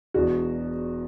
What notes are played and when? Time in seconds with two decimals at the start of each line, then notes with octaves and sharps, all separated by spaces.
0.14 E1 E2 B2 D4 F#4